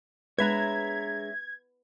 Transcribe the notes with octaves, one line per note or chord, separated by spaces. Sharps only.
G#3 B3 D4 B4 C#5 E5 A#5 G#6